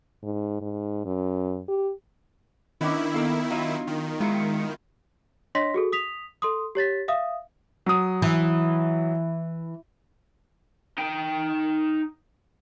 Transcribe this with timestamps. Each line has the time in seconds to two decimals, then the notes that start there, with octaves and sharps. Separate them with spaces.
0.23 G#2
0.61 G#2
1.05 F#2
1.68 G4
2.81 D#3 B3 C#4 D4 E4 D#5 E5 D6
3.14 A#3 B3 A4 F5
3.50 F#3 D#4 F4
3.87 D#3
4.20 F#3 G#3 E4 F4 C#7
5.55 D4 C#5 D#5 C6 A#6 B6
5.74 F#4 G#4 A4
5.92 D#6 B6 F7
6.42 A4 C6 D#6
6.75 G4 C#5 A6 B6
7.08 E5 F5 D#6
7.86 F#3 D#6
8.22 E3
10.98 D#4 G5